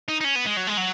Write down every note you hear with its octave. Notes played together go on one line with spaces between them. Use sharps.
D#4
D#4
C#4
B3
G#3
F#3
G#3
F#3